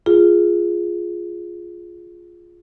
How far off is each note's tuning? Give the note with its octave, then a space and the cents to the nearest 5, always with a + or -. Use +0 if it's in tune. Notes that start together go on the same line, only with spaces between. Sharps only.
F4 +0 G#4 +0